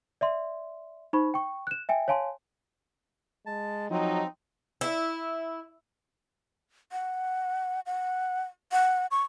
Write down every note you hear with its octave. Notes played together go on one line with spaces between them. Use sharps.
D5 E5 C6
D#4 C5 B5 C#6
G5 C#6
F#6 E7
E5 G5 G#5
C#5 F5 G#5 A5 C6
G#3 A5
F3 F#3 C4 D#4
E4
F#5
F#5
F#5
C#6